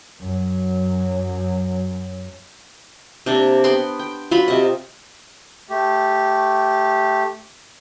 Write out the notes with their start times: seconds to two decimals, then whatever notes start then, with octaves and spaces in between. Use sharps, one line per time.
0.21 F#2 F#3
3.26 C3 A#3 D4
3.64 B3 G5 C6
3.99 G5
4.31 F#3 F4 B5
4.48 C3 D#5
5.70 A3 G4